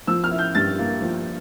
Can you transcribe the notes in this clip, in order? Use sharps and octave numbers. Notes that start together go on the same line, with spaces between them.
F3 E6
F6
E4
G6
G2 A6
A#3
F3